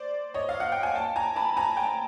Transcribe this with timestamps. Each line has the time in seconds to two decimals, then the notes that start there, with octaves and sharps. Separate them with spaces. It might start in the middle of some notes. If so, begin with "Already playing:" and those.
Already playing: C5 D5
0.34 C#5 D#5
0.49 F5
0.60 F#5
0.72 G5
0.83 G#5
0.95 G5 A5
1.16 G#5 A#5
1.36 A5 B5
1.57 G#5 A#5
1.77 G5 A5